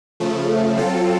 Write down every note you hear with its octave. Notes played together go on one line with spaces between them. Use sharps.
C#3 F3 A3
F#3 C4 F4 A4